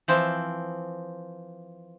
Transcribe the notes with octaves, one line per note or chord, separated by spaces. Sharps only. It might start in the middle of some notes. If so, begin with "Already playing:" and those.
E3 F3 C4